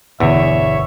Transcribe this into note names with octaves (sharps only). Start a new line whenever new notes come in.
G1 E2 B2 D3 C#5 E5